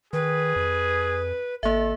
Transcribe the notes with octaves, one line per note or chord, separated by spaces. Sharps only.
D#3 G#4 B4
F2
G#1 A#3 A4 E5